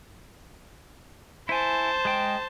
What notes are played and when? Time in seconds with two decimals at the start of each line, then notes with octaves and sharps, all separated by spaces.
1.49 E4 C5 G#5 A5
2.05 G#3 G5